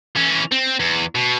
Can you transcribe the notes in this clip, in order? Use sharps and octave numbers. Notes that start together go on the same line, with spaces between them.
E3 C#4
C4
E2
B2